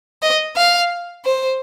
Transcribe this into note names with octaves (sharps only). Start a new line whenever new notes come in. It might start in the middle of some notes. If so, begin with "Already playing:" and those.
D#5
F5
C5